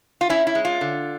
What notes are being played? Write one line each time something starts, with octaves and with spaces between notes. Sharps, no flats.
F4
C#4 E4
E4
G#3
F4
D3